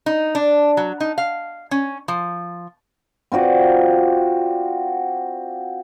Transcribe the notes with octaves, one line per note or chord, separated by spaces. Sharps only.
D#4
D4
F#3
D#4
F5
C#4
F3
C4 F4 F#4 D5